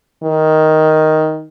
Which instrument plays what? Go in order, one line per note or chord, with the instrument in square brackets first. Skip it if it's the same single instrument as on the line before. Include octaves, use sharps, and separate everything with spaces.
[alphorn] D#3